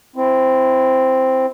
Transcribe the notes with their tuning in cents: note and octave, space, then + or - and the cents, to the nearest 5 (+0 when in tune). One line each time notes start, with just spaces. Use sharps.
C4 +0 E4 +20